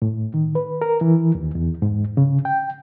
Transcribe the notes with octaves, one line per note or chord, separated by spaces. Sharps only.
A2
D#3
B4
A#4
E3
D#2
E2
G#2
C#3
G5